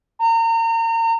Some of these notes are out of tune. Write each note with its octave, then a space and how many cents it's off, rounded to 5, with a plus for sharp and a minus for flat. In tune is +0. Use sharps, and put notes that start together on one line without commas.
A#5 -35